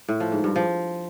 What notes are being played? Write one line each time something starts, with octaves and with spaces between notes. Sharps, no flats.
A2
F3
G#2
G2
F3